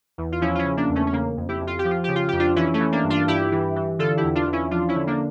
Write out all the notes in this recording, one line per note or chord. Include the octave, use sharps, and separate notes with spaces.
E2
F4
F3 C#4 E4
F4
C#4 E4
C#3
A#3 D4
E2
A3 C#4
C#4
C#3 A#3
F2
E4 G4
F2
F4
G4
F3
F4
C#3 G4
F4
F2 G4
D4 F4
E3 C#4 E4
A3 C#4
E3
A#3 D4
G2
D4 F4
G2 E4 G4
E3
E3
D3 F4 A4
E4 G4
E2
D4 F4
E2
C#4 E4
F3 D4 F4
C#4 E4
D3
A#3 D4